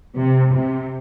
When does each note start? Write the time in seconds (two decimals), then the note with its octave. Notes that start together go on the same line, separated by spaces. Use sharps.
0.15 C3
0.52 C3